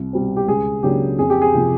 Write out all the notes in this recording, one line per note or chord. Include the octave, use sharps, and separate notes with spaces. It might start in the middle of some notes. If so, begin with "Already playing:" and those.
Already playing: C2
B2 G3 C4
G4
C#2 G#4
C#3 F#3 A#3 D4 G4
F2 G#4
G4
G#4
C3 F3